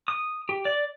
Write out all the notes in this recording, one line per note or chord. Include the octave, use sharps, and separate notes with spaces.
D#6
G4
D5